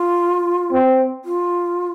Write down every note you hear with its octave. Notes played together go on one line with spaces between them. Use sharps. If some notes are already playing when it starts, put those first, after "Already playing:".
Already playing: F4
C4
F4